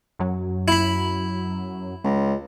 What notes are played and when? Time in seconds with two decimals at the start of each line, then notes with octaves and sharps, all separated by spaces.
0.19 F#2 F#3
0.68 E4 B5
2.04 C#2